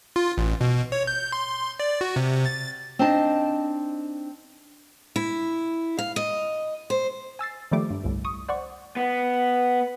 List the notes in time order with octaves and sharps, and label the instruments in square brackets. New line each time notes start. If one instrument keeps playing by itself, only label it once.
[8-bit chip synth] F4
A1
B2
C#5
G6
C6
D5
F#4
C3
A6
[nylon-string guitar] C4 D4 D#4 D#5 A5
[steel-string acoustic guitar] E4
F5
D#5
C5
[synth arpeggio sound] G#5 E6 A6 C7
D#3 F3 G3 A3 D6
G2
G1 C2 A2
C#6 D#6
C5 D5 F#5 C#6
[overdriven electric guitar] B3